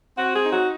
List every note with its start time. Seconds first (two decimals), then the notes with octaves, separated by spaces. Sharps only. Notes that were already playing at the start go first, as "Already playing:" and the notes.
0.18 C4 F#4
0.36 G#4
0.45 D#4
0.53 F#4